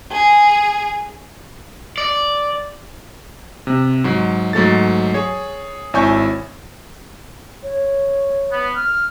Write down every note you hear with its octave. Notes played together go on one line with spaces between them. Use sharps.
G#4
D5
C3
G#2 F#3
G#2 F#3 A3 A6
G#4 C#5
G#1 E4 C#5 G#5 C#6 G6
C#5
B3
F6